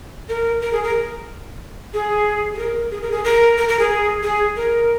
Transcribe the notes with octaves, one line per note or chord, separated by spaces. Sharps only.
A#4
A#4
G#4
A#4
G#4
G#4
A#4
G#4
A#4
G#4
A#4
A#4
A#4
G#4
G#4
A#4